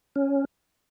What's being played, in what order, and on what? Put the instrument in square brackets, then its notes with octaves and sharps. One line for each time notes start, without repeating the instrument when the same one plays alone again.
[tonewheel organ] C#4